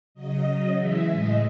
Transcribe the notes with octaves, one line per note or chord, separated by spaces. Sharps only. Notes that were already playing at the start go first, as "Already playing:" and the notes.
C#3 F#3 D#5
C#3 F#3
C#3 E3 G#3 E5
A2 G#3 D#5